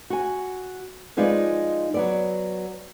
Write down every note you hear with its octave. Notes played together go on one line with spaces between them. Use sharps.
F#4 G#5
F3 G#3 D#4 F4 B4 D5
F#3 B3 D5